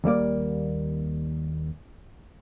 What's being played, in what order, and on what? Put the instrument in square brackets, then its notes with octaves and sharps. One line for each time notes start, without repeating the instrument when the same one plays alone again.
[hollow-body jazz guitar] D#2 G3 A#3 D5